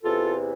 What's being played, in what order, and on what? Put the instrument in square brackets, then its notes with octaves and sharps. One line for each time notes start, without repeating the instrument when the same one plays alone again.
[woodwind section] E2 C3 E3 F4 A4